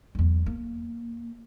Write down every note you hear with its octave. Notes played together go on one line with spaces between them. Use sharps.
E2 F#3
A#3